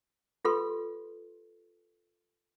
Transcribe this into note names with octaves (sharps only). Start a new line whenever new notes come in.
F4 G4 A4 B4 C6